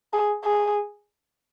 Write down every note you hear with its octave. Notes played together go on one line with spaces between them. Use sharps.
G#4
G#4